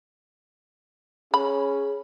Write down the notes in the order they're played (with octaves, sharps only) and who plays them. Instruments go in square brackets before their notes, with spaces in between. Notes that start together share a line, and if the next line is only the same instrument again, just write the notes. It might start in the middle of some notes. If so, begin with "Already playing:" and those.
[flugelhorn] C#4 [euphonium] G#4 [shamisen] B5